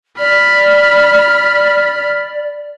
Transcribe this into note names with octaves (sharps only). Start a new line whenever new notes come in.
D5 B5 F6